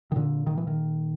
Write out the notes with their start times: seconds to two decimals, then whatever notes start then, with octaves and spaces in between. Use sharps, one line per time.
0.12 D#3
0.16 A#2 D3
0.47 D#3
0.58 E3
0.67 D#3